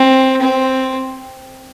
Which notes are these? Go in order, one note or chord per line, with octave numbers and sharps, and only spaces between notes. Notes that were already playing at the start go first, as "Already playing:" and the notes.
Already playing: C4
C4